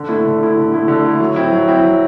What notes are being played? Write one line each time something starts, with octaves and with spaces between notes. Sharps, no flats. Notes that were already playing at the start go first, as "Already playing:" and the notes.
Already playing: D3
A3 E4
D3
A3 E4
D3
A3 E4
D3
A3 E4
F#3
C4 E4
F#3
C4 E4
F#3